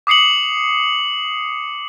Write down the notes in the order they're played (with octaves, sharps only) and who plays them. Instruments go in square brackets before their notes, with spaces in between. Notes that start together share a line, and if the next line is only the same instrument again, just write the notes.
[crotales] D6 D#6 C7 C#7 F#7